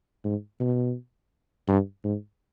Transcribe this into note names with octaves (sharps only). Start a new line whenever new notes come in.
G#2
B2
G2
G#2